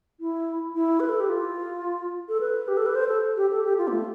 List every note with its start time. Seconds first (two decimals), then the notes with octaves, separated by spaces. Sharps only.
0.20 E4
0.75 E4
1.00 B4
1.09 A4
1.20 G4
1.30 F4
2.29 A4
2.41 B4
2.68 G4
2.77 A4
2.86 B4
2.95 C5
3.09 A4
3.37 G4
3.51 A4
3.64 G4
3.78 F4
3.88 B3
3.92 A3